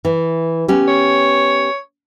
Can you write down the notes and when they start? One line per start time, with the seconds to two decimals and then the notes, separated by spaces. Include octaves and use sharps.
0.05 E3
0.68 B3 C#4 G4
0.88 C#5